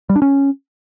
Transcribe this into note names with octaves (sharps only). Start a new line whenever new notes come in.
G3
D4
C#4